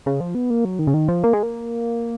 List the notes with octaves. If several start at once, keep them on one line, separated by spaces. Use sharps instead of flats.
C#3
F3
B3
A#3
F#3
D#3
C#3
D#3
F3
A#3
G#3
A#3